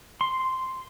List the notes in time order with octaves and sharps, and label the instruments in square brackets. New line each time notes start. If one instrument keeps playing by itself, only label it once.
[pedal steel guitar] C6